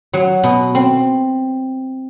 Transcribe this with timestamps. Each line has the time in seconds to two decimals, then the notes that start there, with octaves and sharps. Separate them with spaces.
0.13 F#3
0.44 B2
0.75 C4